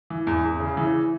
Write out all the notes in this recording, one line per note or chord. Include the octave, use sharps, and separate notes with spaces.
E3
E2
E2
C#3
E3